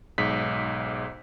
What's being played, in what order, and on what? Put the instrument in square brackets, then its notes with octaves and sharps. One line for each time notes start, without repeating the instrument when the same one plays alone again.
[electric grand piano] B1 G#2 B6